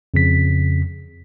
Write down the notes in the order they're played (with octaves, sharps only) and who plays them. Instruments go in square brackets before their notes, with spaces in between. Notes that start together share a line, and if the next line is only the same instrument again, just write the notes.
[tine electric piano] F2 C#3 B6